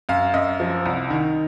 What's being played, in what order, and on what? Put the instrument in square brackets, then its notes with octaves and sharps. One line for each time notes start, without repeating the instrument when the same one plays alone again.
[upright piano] F#2 F5
F#2 D#5
F3
C2
D#3